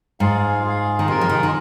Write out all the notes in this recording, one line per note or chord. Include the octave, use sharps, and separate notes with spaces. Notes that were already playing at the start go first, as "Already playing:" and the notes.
G#2 F4 G#4 F5
F4 G#4 F5
D#3
C3 G#3 F4 A#4
F3
D#3
D#3